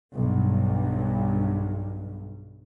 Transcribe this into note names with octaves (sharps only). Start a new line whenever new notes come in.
B1 G2